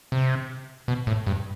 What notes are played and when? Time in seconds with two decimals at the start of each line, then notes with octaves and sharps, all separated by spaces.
0.12 C3
0.88 B2
1.07 A2
1.27 G2